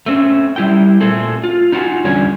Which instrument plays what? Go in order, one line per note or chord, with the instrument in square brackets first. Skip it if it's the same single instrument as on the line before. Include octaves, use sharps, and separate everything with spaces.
[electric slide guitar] A3 C4 C#4
G3 E4 G5
A#2 A3 C4 G#4 A4
F4
D#4 F4 F#4 A4 F#5 G#5
E2 D3 G3 C#4 C#5 G#5